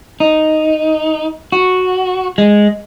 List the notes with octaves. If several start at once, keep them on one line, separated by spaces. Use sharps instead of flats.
D#4
F#4
G#3